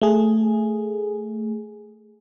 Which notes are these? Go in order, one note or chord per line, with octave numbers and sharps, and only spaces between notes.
A3 G#4